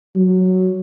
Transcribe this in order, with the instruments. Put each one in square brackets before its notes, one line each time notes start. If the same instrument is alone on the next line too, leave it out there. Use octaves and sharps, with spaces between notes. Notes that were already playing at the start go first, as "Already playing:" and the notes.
[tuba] F#3